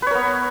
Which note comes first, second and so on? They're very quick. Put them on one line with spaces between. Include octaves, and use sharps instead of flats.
B4 C#5 A#4 B3